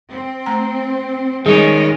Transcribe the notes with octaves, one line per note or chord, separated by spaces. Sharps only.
C4
A3 A#5
D#3 G3 G#3 C#4 G#4 D#5